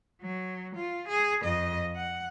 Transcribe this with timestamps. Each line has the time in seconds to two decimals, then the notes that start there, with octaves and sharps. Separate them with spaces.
0.21 F#3
0.75 F4
1.08 G#4
1.42 F2 D#5
1.95 F#5